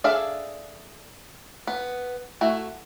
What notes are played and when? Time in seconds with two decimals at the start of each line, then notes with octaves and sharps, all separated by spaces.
0.04 D4 G#4 A4 E5 F5
1.67 B3
2.41 A3 E4 F#4